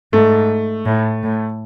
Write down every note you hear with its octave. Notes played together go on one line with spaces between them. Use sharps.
G#2 A3
A2
A2